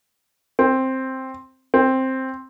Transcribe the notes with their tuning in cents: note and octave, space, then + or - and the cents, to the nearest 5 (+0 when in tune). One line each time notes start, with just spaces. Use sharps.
C4 +5
C4 +5